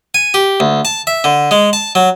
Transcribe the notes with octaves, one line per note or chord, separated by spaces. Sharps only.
G#5
G4
D2
A5
E5
D3
G#3
A5
F#3